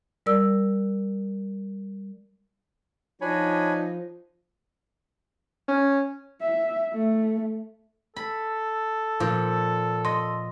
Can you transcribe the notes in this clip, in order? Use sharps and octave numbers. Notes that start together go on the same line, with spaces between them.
G3 A#4 D5 E6
F3 D4 D#4 C#5 G#5 B5
C#4
E5
A3
A4 B5
A#2 F3
D#5 C6